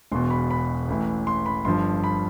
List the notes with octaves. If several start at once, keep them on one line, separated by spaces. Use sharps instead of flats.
E1 E2 B2 C6
B5
B5
A1 A2 E3
C6
B5
G1 G2 F3 C6
B5